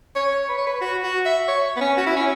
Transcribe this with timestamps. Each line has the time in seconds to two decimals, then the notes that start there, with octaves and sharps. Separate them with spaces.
0.16 C#5
0.49 B4
0.58 C#5
0.67 B4
0.82 F#4
1.04 F#4
1.26 E5
1.48 C#5
1.76 B3
1.81 C#4
1.98 F#4
2.07 E4
2.16 C#4